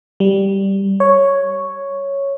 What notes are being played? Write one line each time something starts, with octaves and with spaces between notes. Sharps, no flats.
G3
C#5